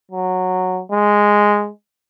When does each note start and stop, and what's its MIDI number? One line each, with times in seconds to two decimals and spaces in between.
0.12 0.81 54
0.92 1.69 56